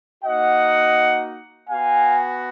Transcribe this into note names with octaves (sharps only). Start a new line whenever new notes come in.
A#3 D#4 F#4 D#5 F#5
B3 F#4 F5 G#5